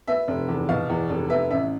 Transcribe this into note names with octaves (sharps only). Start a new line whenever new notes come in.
B3 E5
F1
E2
B2 F5
E2
F1
B3 E5
A1 E5